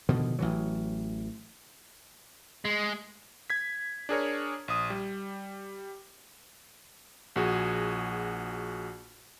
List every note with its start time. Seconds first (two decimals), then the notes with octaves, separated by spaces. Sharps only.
0.09 B2 D3 D#3 F3
0.39 A1 E3 F#3
2.65 G#3
3.50 G#6 B6
4.09 D4 G#4 A#4 C#5
4.68 A#1 D#6
4.90 G3
7.36 A#1 F#4 G#4